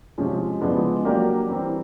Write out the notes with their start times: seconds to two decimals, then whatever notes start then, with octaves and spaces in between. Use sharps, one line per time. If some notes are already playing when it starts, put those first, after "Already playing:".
0.18 C3 F3 G#3 C#4
0.61 C#3 F3 G#3 B3 D4
1.05 F#3 A#3 D4 G4 A#4
1.48 E3 G3 C4